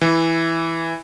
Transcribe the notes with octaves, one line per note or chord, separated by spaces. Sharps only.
E3